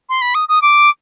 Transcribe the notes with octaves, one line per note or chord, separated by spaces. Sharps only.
C6
B5
D#6
D#6
D6